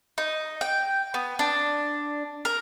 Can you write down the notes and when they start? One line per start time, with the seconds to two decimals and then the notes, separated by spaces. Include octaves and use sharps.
0.18 D#4
0.61 G5
1.14 B3
1.39 D4
2.45 A#4